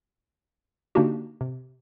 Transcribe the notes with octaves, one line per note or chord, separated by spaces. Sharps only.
D3 A#3 D4 D#4 F#4 G4
C3